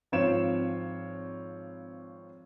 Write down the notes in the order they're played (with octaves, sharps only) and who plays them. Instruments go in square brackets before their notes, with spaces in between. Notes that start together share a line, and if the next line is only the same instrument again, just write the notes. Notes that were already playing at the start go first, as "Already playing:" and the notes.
[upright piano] G#1 F3 C4 F4 C#5 E7